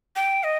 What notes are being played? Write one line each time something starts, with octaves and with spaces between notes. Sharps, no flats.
G5
D#5